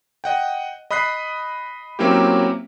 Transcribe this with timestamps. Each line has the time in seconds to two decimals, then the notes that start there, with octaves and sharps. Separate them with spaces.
0.24 D#5 F#5 G5
0.90 D#5 B5 D#6 F#6 B6 C7
1.99 F#3 A#3 C4 C#4 E4 G4